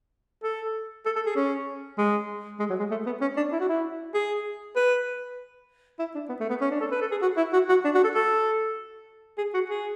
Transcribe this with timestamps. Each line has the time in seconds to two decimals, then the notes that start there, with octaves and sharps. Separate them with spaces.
0.43 A4
1.06 A4
1.16 A4
1.26 G#4
1.35 C#4
1.98 G#3
2.60 G#3
2.70 F#3
2.79 G#3
2.91 A3
3.06 B3
3.21 C#4
3.37 D4
3.52 E4
3.60 F#4
3.69 E4
4.14 G#4
4.76 B4
5.99 E4
6.15 D4
6.29 B3
6.40 A3
6.50 B3
6.61 C#4
6.71 D4
6.80 A4
6.91 B4
7.01 A4
7.11 G#4
7.22 F#4
7.37 E4
7.53 F#4
7.69 F#4
7.85 D4
7.94 F#4
8.04 A4
8.14 A4
9.38 G#4
9.54 F#4
9.69 G#4